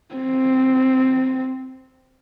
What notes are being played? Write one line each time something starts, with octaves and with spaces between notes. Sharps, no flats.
C4